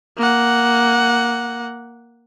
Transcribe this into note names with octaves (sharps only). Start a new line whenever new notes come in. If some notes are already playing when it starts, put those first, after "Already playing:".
A#3 F#5